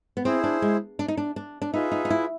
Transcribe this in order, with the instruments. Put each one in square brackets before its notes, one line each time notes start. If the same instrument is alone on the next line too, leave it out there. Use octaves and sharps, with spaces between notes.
[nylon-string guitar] B3
[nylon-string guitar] C4 [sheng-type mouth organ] E4 G#4 C5
[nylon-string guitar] D4
G#3
D4
D#4
D4
D4
D4
[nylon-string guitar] D#4 [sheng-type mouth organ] F4 G#4 B4 E5
[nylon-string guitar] D#4
D#4
E4